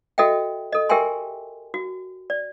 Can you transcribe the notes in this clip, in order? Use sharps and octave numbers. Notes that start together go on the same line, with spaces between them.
F#4 A4 D#5 E5 G5
A4 D#5
G4 A#4 E5 G5 G#5 C6
F#4
D5